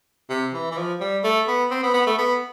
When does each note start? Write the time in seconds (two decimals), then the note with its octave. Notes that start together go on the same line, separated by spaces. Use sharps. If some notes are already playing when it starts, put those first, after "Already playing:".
0.30 C3
0.54 E3
0.72 E3
0.77 F3
1.01 G3
1.24 A3
1.48 B3
1.71 C4
1.83 B3
1.94 B3
2.07 A3
2.19 B3